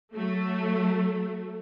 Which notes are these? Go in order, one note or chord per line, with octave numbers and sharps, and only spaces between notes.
F#3 A3